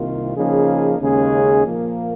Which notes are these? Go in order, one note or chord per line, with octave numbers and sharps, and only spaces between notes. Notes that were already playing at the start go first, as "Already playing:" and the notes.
Already playing: C2 C3 D#3 A#3 F4
C#3 F3 A#3 D#4 G#4
D#2 C#3 G#3 C#4 G#4
A#2 F3 A#3